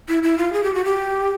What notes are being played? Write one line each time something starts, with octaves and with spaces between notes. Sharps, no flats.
E4
E4
F4
G#4
G4
F#4
G4